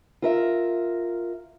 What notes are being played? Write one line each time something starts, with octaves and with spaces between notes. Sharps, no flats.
F4 A#4 E5